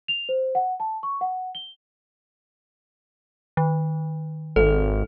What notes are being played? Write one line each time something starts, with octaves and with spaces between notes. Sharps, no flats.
F7
C5
F#5
A5
C#6
F#5
G7
D#3
G#1 A4